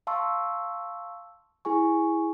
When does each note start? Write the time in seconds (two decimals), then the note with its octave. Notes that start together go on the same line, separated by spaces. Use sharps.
0.07 F5 A5 C6 C#6 E6
1.65 E4 G#4 G#5 C#6